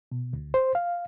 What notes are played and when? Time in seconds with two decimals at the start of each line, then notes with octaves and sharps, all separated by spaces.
0.12 B2
0.33 D2
0.54 C5
0.75 F5